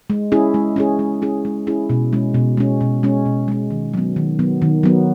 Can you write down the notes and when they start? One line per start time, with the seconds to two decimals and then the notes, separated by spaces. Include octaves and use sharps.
0.10 G#3
0.32 C#4 E4 G#4
0.54 G#3
0.76 C#4 E4 G#4
0.99 G#3
1.22 C#4 E4 G#4
1.45 G#3
1.67 C#4 E4 G#4
1.90 B2
2.13 G#3 C#4
2.34 B2
2.57 G#3 C#4
2.81 B2
3.03 G#3 C#4
3.25 B2
3.48 G#3 C#4
3.71 D#3
3.94 F#3 B3
4.16 D#3
4.39 F#3 B3
4.62 D#3
4.83 F#3 B3